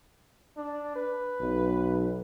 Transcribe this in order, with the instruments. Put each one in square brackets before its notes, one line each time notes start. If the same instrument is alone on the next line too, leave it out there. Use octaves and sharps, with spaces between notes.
[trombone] D4
B4
[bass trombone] B1